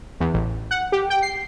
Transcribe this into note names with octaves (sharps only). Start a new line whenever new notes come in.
E2
A1
F#5
G4
G5
C7